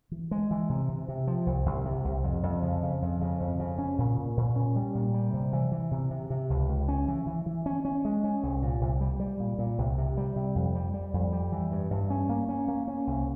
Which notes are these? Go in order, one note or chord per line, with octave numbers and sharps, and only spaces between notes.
E3
G#3
E3
C3
C3
C3
F3
C2
C2
C3
C2
F2
F2
C#3
C#3
F2
C#3
F2
C#3
C#4
A#2
A#2
A#2
C#4
G3
A#2
G3
C3
E3
E3
C3
C3
C3
C#2
C#2
C#4
E3
E3
E3
C#4
C#4
G#3
C#4
C2
A#2
C2
G3
G3
A#2
A#2
C2
C3
G3
C3
F2
G3
G3
F2
G3
E3
G2
G2
C#4
A#3
C#4
A#3
C#4
C2